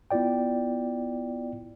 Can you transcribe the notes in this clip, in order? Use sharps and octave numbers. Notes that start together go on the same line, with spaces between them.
B3 E4 F4 D5 G5